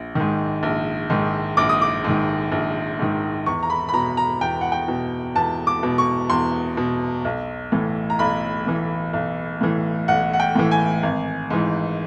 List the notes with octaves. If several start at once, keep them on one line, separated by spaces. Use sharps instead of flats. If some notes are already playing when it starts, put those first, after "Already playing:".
Already playing: A#1
G#2 D#3
A#1
G#2 D#3
A#1 D6
D#6
D6
G#2 D#3
A#1
G#2 D#3
E2 C#6
A#5
B5
B5
B2 A#5
A#5
E2 G5
F#5
G5
B2
E2 A5
D6
B2
C#6
E2 C6
B2
B1
A2 E3
A#5
B1 B5
A2 E3
B1
A2 E3
B1 F#5
F#5
G5
A2 E3
G#5
G#1
G#2 E3